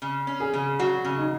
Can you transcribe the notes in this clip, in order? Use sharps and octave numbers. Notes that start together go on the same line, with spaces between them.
C#3
C#4
G#4
C#3
F#3 F#4
C#3
D#4